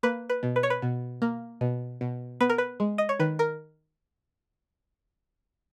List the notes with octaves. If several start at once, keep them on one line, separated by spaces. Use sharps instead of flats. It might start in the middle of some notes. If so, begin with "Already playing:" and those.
A#3 B4
B4
B2
B4
C#5
B4
B2
A#3
B2
B2
B3 B4
A#4
B4
G#3
D#5
C#5
D#3 B4
A#4